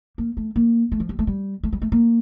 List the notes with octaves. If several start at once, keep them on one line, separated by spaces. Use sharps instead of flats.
A#3
A3
A#3
A3
F3
G3
A3
G3
A3
G3
A3
A#3